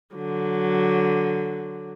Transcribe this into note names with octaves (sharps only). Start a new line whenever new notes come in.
D3 F#3